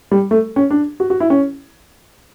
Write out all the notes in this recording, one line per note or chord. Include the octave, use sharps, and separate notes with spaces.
G3
A3
C#4
D4
F#4
F#4
E4
C#4